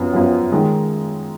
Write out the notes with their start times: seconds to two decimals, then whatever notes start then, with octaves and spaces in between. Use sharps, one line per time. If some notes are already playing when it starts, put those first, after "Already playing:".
Already playing: F#2 F3 B3
0.13 F#2 F3 B3
0.52 D#3 G#3 D#4